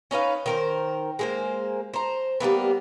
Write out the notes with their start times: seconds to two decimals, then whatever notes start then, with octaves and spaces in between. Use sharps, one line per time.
0.11 C#4 D#4 B4 F5
0.46 D#3 A#4 C5
1.19 G#3 A#3 C5
1.94 C5 A#5
2.40 G3 G#3 A#3 B3